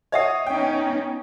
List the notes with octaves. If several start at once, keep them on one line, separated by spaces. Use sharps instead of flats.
C#5 D#5 E5 F#5 D#6
B3 C#4 D#4 G5